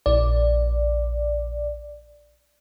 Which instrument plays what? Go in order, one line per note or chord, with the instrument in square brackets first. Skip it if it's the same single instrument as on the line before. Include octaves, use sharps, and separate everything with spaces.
[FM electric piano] A#1 D5